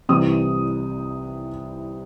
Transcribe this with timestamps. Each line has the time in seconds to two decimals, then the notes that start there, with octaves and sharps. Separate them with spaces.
0.09 C2 C3 E3 G3 D#6